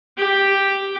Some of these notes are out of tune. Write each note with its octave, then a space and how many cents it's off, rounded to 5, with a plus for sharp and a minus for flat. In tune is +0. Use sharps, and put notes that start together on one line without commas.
G4 +0